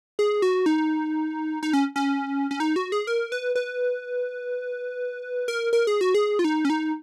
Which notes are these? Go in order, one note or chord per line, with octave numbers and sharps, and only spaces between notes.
G#4
F#4
D#4
D#4
C#4
C#4
C#4
D#4
F#4
G#4
A#4
B4
B4
A#4
A#4
G#4
F#4
G#4
F4
D#4
C#4
D#4